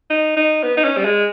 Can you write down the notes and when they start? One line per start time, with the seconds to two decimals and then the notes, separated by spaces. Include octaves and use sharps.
0.10 D#4
0.36 D#4
0.63 B3
0.77 D#4
0.84 C#4
0.97 G3
1.04 G#3